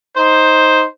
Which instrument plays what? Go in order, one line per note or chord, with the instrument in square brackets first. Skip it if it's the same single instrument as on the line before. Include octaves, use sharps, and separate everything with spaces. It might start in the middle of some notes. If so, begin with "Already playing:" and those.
[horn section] D#4 C5